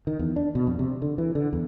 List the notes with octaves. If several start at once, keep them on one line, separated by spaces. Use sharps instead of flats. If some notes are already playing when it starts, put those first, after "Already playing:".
D#3
E2
D4
B2
F2
C3
D3
E3
D3
E2